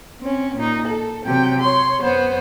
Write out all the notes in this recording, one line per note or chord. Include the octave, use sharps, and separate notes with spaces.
C4 C#4
A#2 D#4
A4
C3 F#3 G5
C#5 C6
F#2 B3 C5 C#5